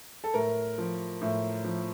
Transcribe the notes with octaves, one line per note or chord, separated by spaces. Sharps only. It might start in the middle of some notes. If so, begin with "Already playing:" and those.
A4
A2 A#4
F3
A2
F3